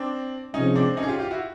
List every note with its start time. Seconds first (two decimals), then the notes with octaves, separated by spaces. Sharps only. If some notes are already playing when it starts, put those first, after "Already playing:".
Already playing: C4 D4
0.53 C3 F3 G#3 C#4 D#4
0.75 C4 D4
0.97 C#4 D#4
1.03 G#4
1.08 F4 G4
1.19 F4 G4
1.31 E4 F#4